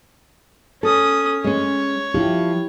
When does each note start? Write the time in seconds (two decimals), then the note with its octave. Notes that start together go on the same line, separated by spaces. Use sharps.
0.83 C#4 A4 D#6
1.44 G#3 C#4 C#5
2.14 F3 E4 G4